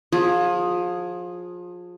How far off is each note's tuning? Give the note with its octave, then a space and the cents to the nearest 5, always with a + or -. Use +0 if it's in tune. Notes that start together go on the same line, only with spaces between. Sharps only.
F3 +25 G#4 +0